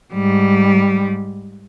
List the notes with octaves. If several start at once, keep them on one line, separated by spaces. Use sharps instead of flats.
G#2 G3